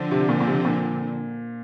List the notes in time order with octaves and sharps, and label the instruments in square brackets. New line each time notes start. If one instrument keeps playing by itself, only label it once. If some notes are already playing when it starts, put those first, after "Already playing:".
Already playing: [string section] D3 F3 C4
[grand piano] C3
A#2
A#2
C3
A#2